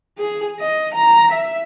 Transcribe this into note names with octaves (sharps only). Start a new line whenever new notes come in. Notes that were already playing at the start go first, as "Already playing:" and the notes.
G#4
D#5
A#5
E5